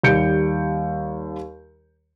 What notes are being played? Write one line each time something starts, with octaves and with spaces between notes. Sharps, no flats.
D#2 G3 G6 C#7 D7